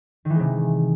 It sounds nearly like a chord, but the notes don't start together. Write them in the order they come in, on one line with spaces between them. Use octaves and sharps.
D#3 E3 G#3 C3